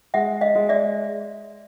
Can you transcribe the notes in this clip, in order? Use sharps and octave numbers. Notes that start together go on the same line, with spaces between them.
G#3 E5 F#5
D#5 F5
G#3
D5 E5